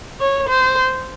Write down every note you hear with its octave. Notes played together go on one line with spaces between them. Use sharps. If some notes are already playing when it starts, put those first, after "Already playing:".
C#5
C5